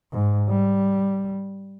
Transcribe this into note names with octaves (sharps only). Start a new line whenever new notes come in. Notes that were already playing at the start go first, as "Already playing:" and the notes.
G#2
G3